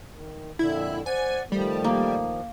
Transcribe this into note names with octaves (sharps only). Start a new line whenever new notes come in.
D#3
F2 A#2 D3 E4
C5 D5 F#5 G#5
D#3 F3 G3 A3
A#3